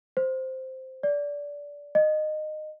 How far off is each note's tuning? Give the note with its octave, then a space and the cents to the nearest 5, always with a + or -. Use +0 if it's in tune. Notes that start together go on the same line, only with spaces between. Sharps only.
C5 +0
D5 -20
D#5 -20